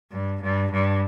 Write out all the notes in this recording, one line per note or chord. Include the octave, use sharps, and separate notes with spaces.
G2
G2
G2